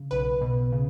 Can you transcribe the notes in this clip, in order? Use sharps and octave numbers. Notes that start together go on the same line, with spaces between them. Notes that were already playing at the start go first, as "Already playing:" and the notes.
Already playing: C#3
B1 B4
B2
C#3